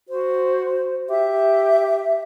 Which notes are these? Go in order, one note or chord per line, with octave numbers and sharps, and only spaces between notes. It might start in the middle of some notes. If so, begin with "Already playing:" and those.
F#4 C5
G4 E5